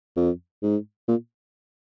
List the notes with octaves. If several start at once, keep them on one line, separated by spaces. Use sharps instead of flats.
F2
G#2
A#2